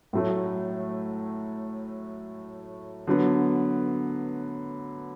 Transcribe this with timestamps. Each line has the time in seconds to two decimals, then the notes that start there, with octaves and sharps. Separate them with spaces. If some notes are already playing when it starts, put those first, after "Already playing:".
0.13 A2 F#3 A3
3.07 D3 F#3 B3